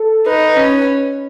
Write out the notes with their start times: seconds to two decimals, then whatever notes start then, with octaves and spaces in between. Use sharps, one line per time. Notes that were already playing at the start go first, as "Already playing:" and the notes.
Already playing: A4
0.26 D#4 B4
0.57 C#4